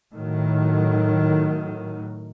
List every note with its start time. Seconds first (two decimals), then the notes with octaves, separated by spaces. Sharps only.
0.14 A2 D#3 F#3